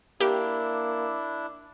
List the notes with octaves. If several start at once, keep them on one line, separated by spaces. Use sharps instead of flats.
A#3 D4 E4 G4